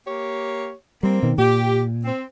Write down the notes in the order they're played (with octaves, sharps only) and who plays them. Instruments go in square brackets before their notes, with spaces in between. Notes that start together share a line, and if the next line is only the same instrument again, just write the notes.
[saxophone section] A#3 G4 C#5
[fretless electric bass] G3 [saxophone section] A#3 C4
[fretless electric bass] B2 D#3
[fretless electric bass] A#2 [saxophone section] G4
[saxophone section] C4